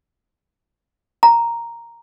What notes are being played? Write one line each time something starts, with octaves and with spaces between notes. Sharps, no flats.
A#5